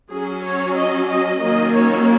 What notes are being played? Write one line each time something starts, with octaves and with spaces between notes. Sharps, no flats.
F#3 C#4 G#4
C#5
D#5
D#5
D#3 F#3 A#3 C#4 D#5
C#5